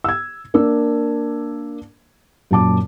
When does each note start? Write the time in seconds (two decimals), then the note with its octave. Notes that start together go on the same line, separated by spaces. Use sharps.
0.04 E6 G#6
0.54 A#3 D4 E6
2.51 F#2 A#2 A5 D6